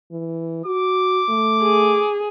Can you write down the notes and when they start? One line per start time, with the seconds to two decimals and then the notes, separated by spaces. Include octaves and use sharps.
0.12 E3
0.66 F#4 D6
1.29 A3
1.63 G#4